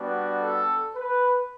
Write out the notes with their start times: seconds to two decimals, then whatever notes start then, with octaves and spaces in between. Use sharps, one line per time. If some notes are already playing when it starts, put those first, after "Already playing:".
Already playing: G3 B3 D4 F#4
0.41 A4
0.96 B4